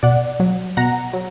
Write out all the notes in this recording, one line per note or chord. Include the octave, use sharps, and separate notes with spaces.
B2 D5 F#5
F#3
B2 F#5 A#5
F#3